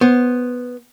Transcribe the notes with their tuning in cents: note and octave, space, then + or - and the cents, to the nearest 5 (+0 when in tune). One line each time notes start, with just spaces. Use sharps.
B3 +0 C5 +15